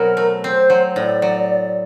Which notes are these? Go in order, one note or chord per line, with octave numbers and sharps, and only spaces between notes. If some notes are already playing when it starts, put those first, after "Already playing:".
Already playing: B2 F#3 C4 A#4
A3
C4 C5
F#3
A2 D5
F#3